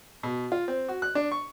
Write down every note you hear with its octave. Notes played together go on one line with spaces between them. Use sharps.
B2
F4
C4
F#4
F#6
D4
C#6